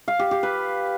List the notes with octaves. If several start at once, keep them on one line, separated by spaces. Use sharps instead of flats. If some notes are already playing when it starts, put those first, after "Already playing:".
F5
G4
G4
B4